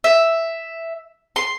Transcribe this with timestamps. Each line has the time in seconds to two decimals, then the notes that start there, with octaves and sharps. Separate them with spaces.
0.04 E5
1.36 C6